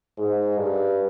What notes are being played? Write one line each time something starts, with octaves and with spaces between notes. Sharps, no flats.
G#2
G2